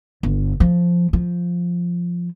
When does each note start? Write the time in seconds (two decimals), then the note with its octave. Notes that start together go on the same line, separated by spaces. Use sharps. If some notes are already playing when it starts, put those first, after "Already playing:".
0.23 G1
0.60 F3
1.13 F3